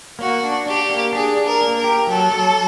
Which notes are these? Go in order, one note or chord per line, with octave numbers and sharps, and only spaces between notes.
A#3 F#4
D4
D4 G4
A#3
D4 G#4
D4
A#4
A#3
A#4
G4
F#3 A4
F#3